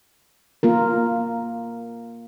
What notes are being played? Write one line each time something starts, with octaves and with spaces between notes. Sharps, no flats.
A#3 F4 A#4